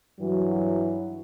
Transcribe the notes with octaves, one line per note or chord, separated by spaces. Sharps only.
G2 E3 F#3